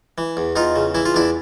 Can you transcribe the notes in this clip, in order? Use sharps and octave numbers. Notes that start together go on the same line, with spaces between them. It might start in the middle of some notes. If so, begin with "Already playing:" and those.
E3
E2
E2 D#4 F4
C#3
E3 E4
F4
E2 D4 E4